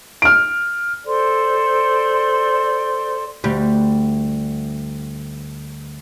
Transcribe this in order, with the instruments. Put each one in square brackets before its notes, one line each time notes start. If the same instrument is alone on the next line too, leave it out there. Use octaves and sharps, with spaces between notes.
[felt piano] F6 D7
[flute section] A4 C5 D5 C6
[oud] D2 G3